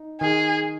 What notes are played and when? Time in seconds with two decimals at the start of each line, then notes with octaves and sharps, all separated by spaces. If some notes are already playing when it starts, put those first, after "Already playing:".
Already playing: D#4
0.21 D#3 G#4